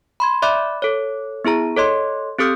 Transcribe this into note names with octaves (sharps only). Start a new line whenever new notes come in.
B5 C6 G#6
D5 E5 B5 D6 F#6
A4 C#5
B3 E4 G#4 A#5
A4 C#5 D#5 C6
C4 G4 A4 D#6 F6 G6